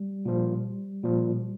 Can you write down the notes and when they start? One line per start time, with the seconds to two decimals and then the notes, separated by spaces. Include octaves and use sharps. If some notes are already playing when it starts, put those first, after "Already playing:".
Already playing: G3
0.25 A#2 F3
1.03 A#2 F3